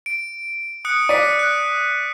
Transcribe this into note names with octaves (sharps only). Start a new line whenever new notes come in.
D7
D#6 F#6 C#7
D5 B6 D#7
F#6